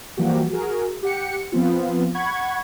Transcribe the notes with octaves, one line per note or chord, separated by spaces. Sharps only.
E3 F3 G3 A#3 F#4 G4
F#4 G#4 A#4
G4 F#5 C#7
F3 B3 C4 F4
F#5 B5 C#6 G#6